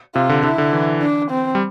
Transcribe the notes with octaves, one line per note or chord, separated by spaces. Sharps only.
C3 F4
D3
D3 E4
D3
E3
D4
C4
G3